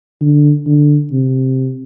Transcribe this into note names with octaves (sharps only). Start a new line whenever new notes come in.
D3
D3
C3